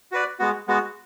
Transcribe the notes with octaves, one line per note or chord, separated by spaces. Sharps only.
F#4 B4 D5
G#3 B3 F#4
G#3 B3 F#4